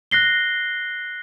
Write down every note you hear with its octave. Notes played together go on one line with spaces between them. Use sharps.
F#6 A#6 C7 G7